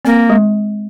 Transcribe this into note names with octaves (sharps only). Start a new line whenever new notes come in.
A#3 C4
G#3